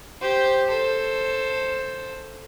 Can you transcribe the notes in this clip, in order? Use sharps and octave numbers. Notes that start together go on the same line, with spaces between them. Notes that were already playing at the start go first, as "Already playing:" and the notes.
G4 C5
A4 C5